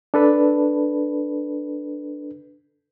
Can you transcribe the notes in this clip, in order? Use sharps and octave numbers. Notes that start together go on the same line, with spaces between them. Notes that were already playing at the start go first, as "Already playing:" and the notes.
D4 A4 B4